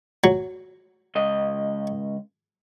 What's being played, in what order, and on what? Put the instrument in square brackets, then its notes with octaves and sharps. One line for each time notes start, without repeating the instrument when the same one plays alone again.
[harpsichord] F#3
[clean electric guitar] C#2 D#5